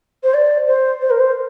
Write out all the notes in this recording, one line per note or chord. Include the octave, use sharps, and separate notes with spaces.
C5
D5
C5
C5
A#4
C5